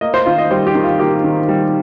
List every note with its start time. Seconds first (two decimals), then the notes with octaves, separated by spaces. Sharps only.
0.01 A#3 D#5
0.14 C5
0.26 D#3 F4
0.38 D#5
0.51 G3 C5
0.67 G4
0.75 D#3
0.83 F4
0.99 A#3 G4
1.24 D#3
1.49 G3